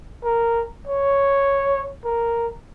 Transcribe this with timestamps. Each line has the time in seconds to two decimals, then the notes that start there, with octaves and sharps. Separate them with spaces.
0.24 A#4
0.87 C#5
2.05 A#4